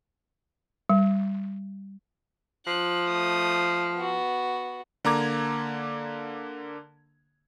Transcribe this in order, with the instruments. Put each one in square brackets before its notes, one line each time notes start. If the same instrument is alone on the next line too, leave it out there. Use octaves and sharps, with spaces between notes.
[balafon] G3
[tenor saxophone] F3 [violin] F#6
[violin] A3 D#6
B3 F#4
[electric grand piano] D3 A#3 A#5 D6 G#6